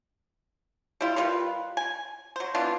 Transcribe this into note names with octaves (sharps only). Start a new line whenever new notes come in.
G3 E4 F4
D#3 G3 F4 B4
G#5
F#3 C5
E3 B3 D4 F4